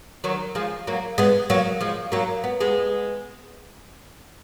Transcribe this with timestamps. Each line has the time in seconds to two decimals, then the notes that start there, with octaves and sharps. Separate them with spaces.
0.24 D#3 F#3
0.55 F3 G#3
0.87 F#3 A#3
1.18 G#3 B3
1.50 F#3 A#3
1.81 F3 G#3
2.12 F#3 A#3
2.44 B3
2.60 G#3 B3